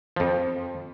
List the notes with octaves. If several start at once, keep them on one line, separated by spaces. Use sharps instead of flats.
F2 F3